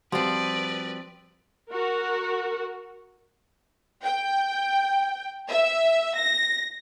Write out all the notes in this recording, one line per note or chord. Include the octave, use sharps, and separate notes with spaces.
F3 G3 C4 F#4 B4 D5
F#4 A#4 F#5
G5
E5
A#6